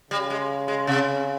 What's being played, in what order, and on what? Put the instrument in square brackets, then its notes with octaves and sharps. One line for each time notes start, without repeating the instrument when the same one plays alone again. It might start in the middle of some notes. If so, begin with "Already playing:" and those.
[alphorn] C#3 [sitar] G3
[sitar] G#3
G#3
C3